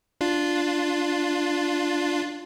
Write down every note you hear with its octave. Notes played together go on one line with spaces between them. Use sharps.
D4 F4